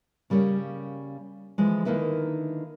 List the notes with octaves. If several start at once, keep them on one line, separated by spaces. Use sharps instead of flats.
C#3 G3 A#3 C#4
D3 E3 F3 G#3
D3 D#3 A#3 D#4 E4 B4